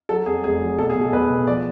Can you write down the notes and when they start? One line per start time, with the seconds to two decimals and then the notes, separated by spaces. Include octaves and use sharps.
0.09 F#3 A4
0.26 F2 G#4
0.44 F1 G#4
0.61 F#3
0.78 B1 A4
0.90 G#4
0.96 B2
1.01 A4
1.13 B1 B4
1.30 B2
1.47 F3 D5